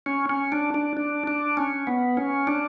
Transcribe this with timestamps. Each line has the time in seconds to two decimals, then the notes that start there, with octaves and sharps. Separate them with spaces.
0.06 C#4
0.30 C#4
0.52 D4
0.74 D4
0.97 D4
1.27 D4
1.57 C#4
1.87 B3
2.17 C#4
2.47 D4